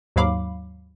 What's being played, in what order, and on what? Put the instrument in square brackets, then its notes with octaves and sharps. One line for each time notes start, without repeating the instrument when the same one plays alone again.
[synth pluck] D#2 G#2 F#3 F5 B5 D6